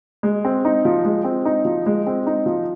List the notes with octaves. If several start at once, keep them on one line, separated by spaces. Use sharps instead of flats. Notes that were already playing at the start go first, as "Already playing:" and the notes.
G#3
C4
D#4
F3
G#3
C4
D#4
F3
G#3
C4
D#4
F3